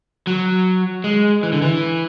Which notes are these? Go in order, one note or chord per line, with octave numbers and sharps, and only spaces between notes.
F#3
G#3
E3
D3
E3